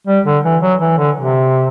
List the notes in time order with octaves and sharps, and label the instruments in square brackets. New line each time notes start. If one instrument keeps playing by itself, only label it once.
[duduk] G3
D3
E3
F#3
E3
D3
C3